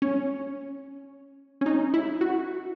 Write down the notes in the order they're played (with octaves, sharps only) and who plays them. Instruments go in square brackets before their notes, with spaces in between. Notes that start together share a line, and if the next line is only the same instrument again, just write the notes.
[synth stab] C#4
C#4
D#4
E4
F#4